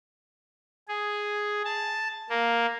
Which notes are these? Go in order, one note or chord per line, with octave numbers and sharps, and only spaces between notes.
G#4
A5
A#3